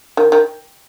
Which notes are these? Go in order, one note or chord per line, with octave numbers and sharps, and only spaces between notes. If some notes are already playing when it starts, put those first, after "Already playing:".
D#3
D#3